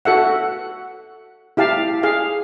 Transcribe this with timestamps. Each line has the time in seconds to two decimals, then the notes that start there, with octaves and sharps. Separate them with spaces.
0.05 F#4 A4 E5 F#5
1.57 E4 G4 F5 A5
2.03 G#4 F5